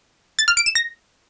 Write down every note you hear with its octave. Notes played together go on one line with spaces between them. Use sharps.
A6
F6
D7
E7
A#6